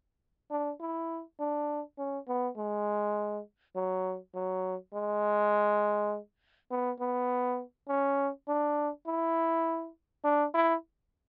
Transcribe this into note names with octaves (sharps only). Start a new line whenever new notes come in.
D4
E4
D4
C#4
B3
G#3
F#3
F#3
G#3
B3
B3
C#4
D4
E4
D4
E4